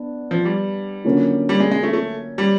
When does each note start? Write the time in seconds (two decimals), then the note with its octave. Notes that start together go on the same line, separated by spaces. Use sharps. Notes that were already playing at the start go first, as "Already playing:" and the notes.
Already playing: B3 D4
0.31 F3
0.45 G3
1.04 D3 F#3 A#3 C#4 F4
1.49 G3
1.60 G#3
1.71 G#3
1.83 A3
1.93 A3
2.38 G3